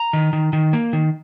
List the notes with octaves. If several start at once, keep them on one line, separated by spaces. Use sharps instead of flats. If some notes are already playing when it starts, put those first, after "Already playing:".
Already playing: A#5
D#3
D#3
D#3
A#3
D#3